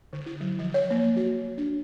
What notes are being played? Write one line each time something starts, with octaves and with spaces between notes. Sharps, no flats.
D3
E4
F#3
F3
C#5
A#3
F#4
D4